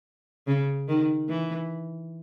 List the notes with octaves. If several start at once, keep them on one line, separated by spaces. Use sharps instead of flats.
C#3
D#3
E3